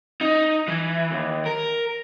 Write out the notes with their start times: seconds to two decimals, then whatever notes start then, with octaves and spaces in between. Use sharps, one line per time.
0.21 D#4
0.68 E3
1.11 D#2
1.46 A#4